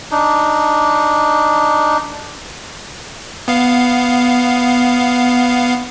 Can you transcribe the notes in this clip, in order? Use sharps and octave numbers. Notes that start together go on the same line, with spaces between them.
D4 D#4
B3 F5